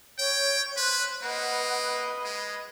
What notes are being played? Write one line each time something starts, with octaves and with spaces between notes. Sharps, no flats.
C#5 G5
B4 C5 F#6
A#3 B4 D#5 F#5
G#3